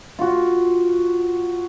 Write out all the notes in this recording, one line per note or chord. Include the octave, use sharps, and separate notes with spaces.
F4 F#4